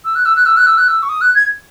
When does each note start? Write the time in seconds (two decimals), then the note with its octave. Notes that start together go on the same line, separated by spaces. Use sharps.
0.04 E6
0.15 F#6
0.25 E6
0.36 F#6
0.45 E6
0.56 F#6
0.66 E6
0.77 F#6
0.87 E6
1.02 C#6
1.09 D#6
1.21 F#6
1.34 G#6